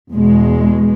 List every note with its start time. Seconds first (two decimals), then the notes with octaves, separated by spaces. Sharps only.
0.13 E2 B2 G#3